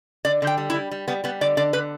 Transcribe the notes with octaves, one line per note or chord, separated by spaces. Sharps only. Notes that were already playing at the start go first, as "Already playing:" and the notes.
D3 D5
D3
G5
G3
E4
G3
G3
G3 B3
G3 B3
D3 D5
D3 D5
D3 B4